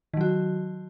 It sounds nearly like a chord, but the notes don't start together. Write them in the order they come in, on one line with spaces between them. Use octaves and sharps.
D#3 F#3 F#4